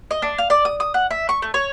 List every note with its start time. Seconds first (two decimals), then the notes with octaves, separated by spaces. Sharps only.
0.11 D#5
0.22 D4
0.38 F5
0.50 D5
0.65 D#6
0.80 D#6
0.94 F#5
1.11 E5
1.29 C#6
1.42 A3
1.54 C#5